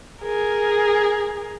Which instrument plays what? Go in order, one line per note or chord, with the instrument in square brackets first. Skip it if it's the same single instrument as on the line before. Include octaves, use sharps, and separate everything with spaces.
[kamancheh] G#4 A#4